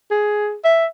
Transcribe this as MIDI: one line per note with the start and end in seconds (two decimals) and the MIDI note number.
0.11 0.55 68
0.64 0.86 76